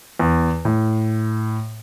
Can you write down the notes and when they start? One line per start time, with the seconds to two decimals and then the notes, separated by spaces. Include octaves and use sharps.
0.19 E2
0.65 A2